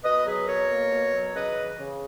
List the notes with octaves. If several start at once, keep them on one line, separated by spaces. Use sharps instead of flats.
B2 B4 D#5
F#3 G#4 B4
B2 A#4 C#5
A#3
B2
F#3
C#3 B4 D#5
E3
C#3